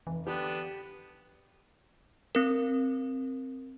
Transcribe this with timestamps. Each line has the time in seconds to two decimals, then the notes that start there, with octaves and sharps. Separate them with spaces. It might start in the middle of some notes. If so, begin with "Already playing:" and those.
0.07 F1 E3
0.27 D3 B3 D4 G4
2.35 C4 A#4